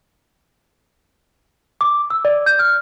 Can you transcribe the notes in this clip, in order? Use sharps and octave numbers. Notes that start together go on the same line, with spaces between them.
D6
E6
D5
G6
F6